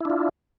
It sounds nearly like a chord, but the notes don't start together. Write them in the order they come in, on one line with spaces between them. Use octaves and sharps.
E4 D4 F4